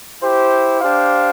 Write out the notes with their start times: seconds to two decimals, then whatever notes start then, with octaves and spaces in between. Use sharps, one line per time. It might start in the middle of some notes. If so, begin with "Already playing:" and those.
0.21 E4 G4 C5
0.81 D4 G4 C5 F5